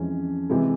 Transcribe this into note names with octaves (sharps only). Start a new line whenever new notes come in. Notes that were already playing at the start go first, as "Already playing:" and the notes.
Already playing: F2 E3 G#3 C#4
C3 E3 G#3